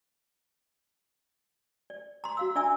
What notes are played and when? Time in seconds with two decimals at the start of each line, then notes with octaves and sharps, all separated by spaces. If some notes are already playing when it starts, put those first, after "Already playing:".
1.90 D5
2.24 A#5 C6
2.37 F#4 F5 E6
2.55 D4 D5 E5 G#5 A#5 E6